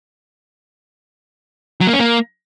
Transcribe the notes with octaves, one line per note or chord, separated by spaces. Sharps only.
F#3
A#3
C#4
A#3